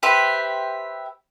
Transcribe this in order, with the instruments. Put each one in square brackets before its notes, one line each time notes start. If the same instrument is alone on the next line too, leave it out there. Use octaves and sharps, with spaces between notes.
[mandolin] G4 B4 C5 E5